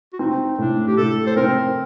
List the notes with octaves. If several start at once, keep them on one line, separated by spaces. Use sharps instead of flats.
F#4
C4 D#4
A2 D4
G4
A2 A4
C5
C4 A#4